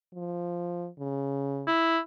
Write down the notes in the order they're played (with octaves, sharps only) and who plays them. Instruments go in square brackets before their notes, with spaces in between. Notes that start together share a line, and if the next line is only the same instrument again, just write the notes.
[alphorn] F3
C#3
[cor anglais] E4